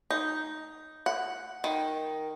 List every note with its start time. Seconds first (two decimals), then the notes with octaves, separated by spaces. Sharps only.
0.10 D#4
1.06 F#5
1.64 D#3